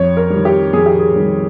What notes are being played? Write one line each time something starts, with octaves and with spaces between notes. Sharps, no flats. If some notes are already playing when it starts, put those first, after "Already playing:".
Already playing: F2 C#5
A#4
D#3 G3
G4
F2 G#4
G4
G#4
D#3 G3